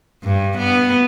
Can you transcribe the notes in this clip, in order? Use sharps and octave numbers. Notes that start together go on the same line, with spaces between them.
G2
B3